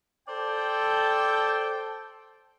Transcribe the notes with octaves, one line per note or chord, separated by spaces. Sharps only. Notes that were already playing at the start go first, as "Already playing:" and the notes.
A4 C5 D5 G5 A5